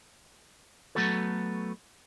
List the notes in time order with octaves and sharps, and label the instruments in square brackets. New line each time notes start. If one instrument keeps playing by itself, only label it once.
[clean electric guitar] F#3 G3 A3 B3 F#4 A4